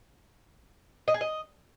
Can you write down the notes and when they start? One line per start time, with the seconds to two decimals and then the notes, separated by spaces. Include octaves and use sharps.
1.08 D#5
1.14 G#4
1.21 D#5